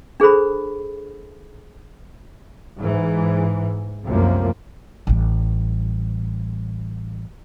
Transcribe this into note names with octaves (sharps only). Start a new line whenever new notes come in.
D4 G#4 A4 C5 B5
G#2 E3
C2 F#2 C3 F3 A3 A#3
A1 G3